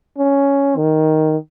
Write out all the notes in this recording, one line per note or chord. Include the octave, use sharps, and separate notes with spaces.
C#4
D#3